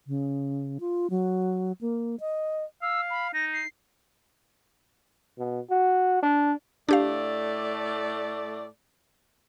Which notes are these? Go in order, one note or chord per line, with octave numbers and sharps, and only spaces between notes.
C#3
F4
F#3
A#3
D#5
F5 E6
B5
D#4 A#6
C7
B2
F#4
D4
A2 A3 D4 G4 D5 F5